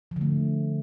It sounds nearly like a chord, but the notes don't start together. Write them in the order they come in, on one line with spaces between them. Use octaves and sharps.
F3 D3 A3